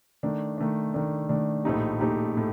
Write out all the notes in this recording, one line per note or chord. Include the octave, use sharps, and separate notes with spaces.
D#3 A3 D4
D#3 A3 D4
D#3 A3 D4
D#3 A3 D4
A#1 A2 A3 D#4 G4
A#1 A2 A3 D#4 G4
A2 A3